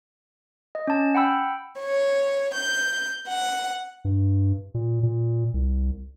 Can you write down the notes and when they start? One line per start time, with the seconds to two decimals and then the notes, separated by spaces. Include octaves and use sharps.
0.75 D#5
0.87 C#4 A5
1.15 F#5 G5 B5 E6
1.81 C#5
2.54 G6
3.28 F#5
4.05 G2
4.74 A#2
5.03 A#2
5.54 C2